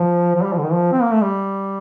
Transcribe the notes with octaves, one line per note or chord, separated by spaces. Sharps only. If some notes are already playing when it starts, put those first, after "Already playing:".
Already playing: F3
F3
G3
F3
D3
D#3
F3
C4
A#3
A3
G3